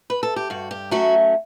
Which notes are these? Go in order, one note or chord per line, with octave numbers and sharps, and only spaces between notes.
B4
A4
G4
G2 F#4
G4
F#3 A3 C#4 F#4